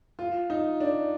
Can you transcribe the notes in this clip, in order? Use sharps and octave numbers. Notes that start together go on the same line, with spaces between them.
F4
D#4
D4